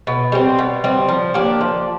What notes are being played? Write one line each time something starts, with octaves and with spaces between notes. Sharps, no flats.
B2
G3 C4
B2
G3 C4
F3
A#3 D4 G4
F3